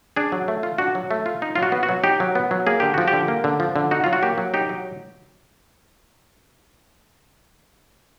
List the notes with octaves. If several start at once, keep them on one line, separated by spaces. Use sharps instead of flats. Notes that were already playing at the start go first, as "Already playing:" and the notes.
D4 G#4
F#3
A3
F4
D4 F#4
F#3
A3
F4
D#4
F#3 F4
F#4
B3
F#4
F#3
D#4 G4
F#3
B3
F#3
A#3 G#4
D3 G4
F3 F#4
G4
D3
A#3
D3
F3
D3
D#4 F#4
F#3 F4
F#4
A#3 G4
F#3
D#4 G4
F#3